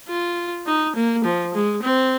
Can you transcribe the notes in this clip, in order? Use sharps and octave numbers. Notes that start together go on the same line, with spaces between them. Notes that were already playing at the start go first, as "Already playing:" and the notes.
F4
D#4
A#3
F3
G#3
C4